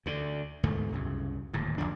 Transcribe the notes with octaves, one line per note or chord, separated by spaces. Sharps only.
D2 D3
D2 G#2 B2 A3
C2 F#2 C#3
D1 D#2 G#2
F1 D#2 F3 D4